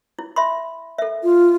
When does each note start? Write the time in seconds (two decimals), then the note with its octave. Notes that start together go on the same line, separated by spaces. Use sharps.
0.19 E4
0.36 E5 B5 C6
0.98 A4 E5
1.23 F4